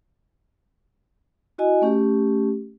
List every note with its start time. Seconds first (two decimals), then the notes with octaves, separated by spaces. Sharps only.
1.58 E4 F#4 D#5 G#5
1.82 A3 C#4 G4